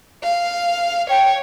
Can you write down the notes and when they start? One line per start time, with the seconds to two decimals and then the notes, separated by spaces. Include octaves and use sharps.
0.23 F5
1.10 C#5 G5